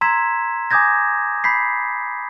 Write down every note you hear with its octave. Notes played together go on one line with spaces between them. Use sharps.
A#5 C6 E6 G#6 B6 E7
G#5 D6 D#6 G6 G#6 A#6
B5 G6 B6 C7